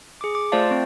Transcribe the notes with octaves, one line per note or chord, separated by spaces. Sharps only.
G#4 D6
D6
A3 F4 C5 D5 F5 A5
C4